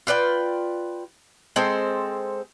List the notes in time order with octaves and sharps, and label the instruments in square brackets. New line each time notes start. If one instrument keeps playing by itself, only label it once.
[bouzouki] F4 B4 D5 G5
G#3 C4 A4 C5